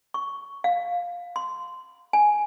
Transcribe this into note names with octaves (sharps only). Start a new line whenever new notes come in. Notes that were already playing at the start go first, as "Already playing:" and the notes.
C#6
F5
C6
G#5